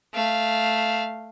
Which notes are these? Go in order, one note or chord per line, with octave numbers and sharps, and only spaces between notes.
A3 F5